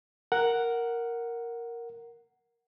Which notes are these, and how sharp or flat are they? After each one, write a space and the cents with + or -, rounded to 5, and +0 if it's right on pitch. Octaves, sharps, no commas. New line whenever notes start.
A#4 +0 F#5 +0